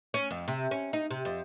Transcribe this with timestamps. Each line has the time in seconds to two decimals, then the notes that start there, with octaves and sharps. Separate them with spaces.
0.14 C#4
0.31 F2
0.48 C3
0.71 C#4
0.93 D#4
1.10 C3
1.25 F2